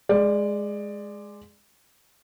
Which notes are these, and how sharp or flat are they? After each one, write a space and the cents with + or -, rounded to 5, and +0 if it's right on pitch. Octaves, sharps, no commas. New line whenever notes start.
G#3 +0 D5 +15